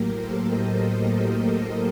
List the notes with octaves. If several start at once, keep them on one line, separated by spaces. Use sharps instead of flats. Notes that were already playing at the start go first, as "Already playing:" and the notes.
Already playing: A2 F#3 A#3 G4 A#4
A4 C5
C5 D#5